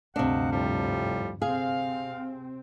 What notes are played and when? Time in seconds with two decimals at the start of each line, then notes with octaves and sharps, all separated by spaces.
0.16 G#1 D2 G2 C3 D4 D#5 F5 F#5
0.52 A2 F3 G3
1.42 C3 C4 G#4 F5